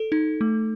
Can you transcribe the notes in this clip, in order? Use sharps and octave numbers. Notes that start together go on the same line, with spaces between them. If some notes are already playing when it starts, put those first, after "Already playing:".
Already playing: A4
D#4
A3